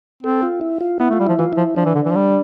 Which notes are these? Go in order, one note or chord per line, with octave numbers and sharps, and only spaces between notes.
C4 A4
F4
E4
F4
B3 E4
A3
F4
G3
F3 E4
E3 F4
F3 E4
F3 D4
E3
D3
E3
F3
G3